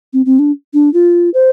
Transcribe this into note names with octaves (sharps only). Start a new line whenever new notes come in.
C4
C4
D4
D4
F4
C5